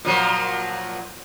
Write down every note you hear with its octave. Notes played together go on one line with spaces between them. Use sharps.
A#2 F3 F#3